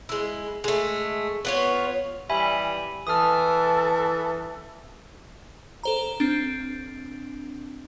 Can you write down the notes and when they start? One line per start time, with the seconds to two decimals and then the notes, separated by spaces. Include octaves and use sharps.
0.09 G#3 E4
0.64 G#3 A3
1.45 B3 F4 C#5
2.30 E3 G3 E5 G#5 B5
3.07 E3 A4 D#6 F6
5.83 A4 C5 A#5
6.20 C4 D4